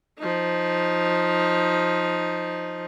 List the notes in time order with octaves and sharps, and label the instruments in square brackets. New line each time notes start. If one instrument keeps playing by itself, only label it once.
[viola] F3 D#4